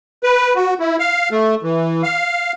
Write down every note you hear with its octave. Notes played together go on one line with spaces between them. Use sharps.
B4
F#4
E4
F5
A3
E3
F5